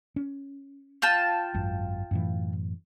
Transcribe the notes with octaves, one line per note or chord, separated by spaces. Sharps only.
C#4
F4 G5 A5
G#1 F#2
F#2 A2 E3